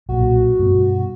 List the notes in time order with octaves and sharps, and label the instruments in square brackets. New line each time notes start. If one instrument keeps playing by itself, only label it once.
[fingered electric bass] B1 A#2 [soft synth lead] F#4
[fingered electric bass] G2 B2